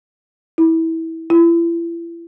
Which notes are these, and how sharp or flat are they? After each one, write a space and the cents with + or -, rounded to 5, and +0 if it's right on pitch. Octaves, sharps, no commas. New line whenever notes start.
E4 -20
E4 +35